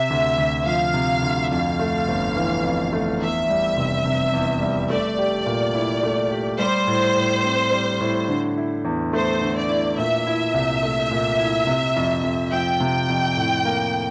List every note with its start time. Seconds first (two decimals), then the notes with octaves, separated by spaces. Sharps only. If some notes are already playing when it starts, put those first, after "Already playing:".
Already playing: C3 E5
0.10 D2
0.38 D2
0.66 F3 F5
0.94 C3
1.22 D2
1.51 F2 F5
1.79 A3
2.08 G1
2.36 E3
2.64 F2
2.93 A3
3.20 E2 E5
3.49 G3
3.76 F1
4.05 C3
4.33 E2
4.61 G3
4.89 A3 D5
5.19 G4
5.46 A#2
5.75 E4
6.03 A3
6.31 G4
6.59 G3 C5
6.87 A2
7.16 A2
7.44 C4
7.72 G3
8.00 A2
8.28 D3
8.58 E4
8.85 E2
9.13 A3 C5
9.41 D3
9.56 D5
9.69 E4
9.98 A#2 E5
10.27 E4
10.54 C2
10.83 A3
11.11 A#2
11.40 E4
11.67 C3
11.96 F2
12.23 F2
12.52 F3 G5
12.80 C3
13.09 F2
13.37 A2
13.65 A#3